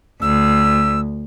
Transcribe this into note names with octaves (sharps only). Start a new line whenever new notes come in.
D2 E6